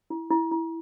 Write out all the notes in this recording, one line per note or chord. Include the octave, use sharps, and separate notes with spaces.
E4
E4
E4